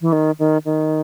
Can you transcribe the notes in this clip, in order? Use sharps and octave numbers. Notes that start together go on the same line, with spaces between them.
E3
D#3
D#3
D#3